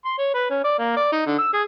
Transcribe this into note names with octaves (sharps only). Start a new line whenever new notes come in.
C6
C#5
B4
C#4
D5
A#3
D5
D#4
D3
E6
G#4